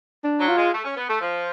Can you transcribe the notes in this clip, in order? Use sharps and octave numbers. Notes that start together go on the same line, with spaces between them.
D4
F#3
F4
G#3
A3
C#4
B3
A3
F3